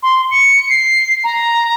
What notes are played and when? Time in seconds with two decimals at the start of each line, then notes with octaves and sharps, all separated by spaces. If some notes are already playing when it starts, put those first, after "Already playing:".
0.03 C6
0.31 C#7
0.70 C7
1.24 A#5